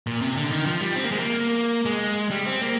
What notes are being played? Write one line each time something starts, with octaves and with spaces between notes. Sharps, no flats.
A#2
C3
D3
D#3
F3
G3
C4
A#3
G#3
A#3
G#3
G3
C4
A#3